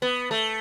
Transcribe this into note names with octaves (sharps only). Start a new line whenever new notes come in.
B3
A3